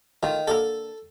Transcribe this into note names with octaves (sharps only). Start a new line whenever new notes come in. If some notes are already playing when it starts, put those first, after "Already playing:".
D#3 A3 F4
D3 A#3 A4 A#4